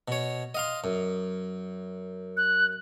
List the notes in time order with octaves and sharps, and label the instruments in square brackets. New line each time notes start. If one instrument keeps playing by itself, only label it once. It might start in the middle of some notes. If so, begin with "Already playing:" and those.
[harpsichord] B2 C#5
D#5 F5 C6
F#2
[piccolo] F#6